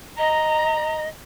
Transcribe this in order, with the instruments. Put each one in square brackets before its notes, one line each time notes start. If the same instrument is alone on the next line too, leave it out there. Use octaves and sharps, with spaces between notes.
[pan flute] D#5 [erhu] A#5